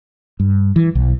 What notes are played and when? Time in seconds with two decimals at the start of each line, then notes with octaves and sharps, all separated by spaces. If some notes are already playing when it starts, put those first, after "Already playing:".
0.40 G2
0.76 E3
0.95 B1